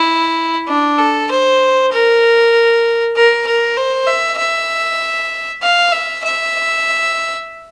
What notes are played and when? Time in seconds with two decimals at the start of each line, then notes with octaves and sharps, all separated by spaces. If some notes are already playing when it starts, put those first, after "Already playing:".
Already playing: E4
0.68 D4
0.99 A4
1.30 C5
1.92 A#4
3.16 A#4
3.47 A#4
3.77 C5
4.07 E5
4.38 E5
5.62 F5
5.93 E5
6.24 E5